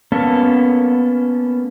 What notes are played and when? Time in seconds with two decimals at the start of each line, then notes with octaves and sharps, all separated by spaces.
0.12 A#3 B3 C#4 A4